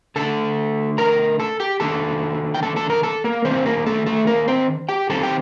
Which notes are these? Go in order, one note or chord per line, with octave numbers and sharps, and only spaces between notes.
D3 A3 D4 A4 A5
A#4 A#5
A4 A5
G4 G5
D#3 A#3 D4 A4 A5
G5
A4 A5
A4 A5
A#4 A#5
A4 A5
A#3 A#4
D#3 A#3 C4 D4 C5
A#3 A#4
A3 A4
A3 A4
A#3 A#4
C4 C5
G4 G5
D#3 G3 C4 A4 A5
G4 G5